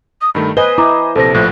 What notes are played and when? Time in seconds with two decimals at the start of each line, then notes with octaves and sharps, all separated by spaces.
0.21 D#6
0.35 G2 D#3 A3 B5
0.57 B4 C5 D#5 G#5 D#6 G7
0.78 E4 A#5 D6
1.15 A#1 C3 A4 C5 A5 A#6
1.34 A#1 A2 F3 F#6